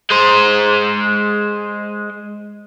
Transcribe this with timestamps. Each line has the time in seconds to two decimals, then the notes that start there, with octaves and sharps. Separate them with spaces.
0.11 G#3 C5